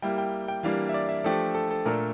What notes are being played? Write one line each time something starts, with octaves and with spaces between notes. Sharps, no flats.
G3 A#3 E4 G5
G5
G5
E3 G3 A#3 D4 F5
E5
D5
E5
F3 A3 D4 G4 A4
A4
A4
A#2 A3 D4 A4 A#4